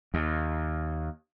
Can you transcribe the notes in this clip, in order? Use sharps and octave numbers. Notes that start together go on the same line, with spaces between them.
D#2